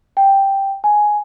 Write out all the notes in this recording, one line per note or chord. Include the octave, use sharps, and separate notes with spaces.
G5
G#5